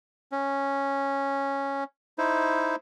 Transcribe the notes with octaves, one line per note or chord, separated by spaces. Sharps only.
C#4
D#4 E4 C5